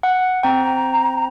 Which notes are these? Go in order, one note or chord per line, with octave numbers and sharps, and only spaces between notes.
F#5
C4 G5 A#5